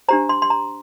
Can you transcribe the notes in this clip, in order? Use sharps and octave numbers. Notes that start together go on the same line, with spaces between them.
D4 G4 C5 A#5
C6
C6
A#5